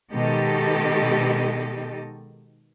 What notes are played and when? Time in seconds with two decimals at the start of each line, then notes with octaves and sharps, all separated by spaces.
0.12 B2 D#3 G#3 G4 A4 D#5